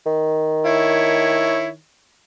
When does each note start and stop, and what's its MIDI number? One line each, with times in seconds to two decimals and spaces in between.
0.06 1.79 51
0.66 1.68 64
0.66 1.68 73